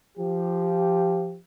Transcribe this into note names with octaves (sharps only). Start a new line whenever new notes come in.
F3 G4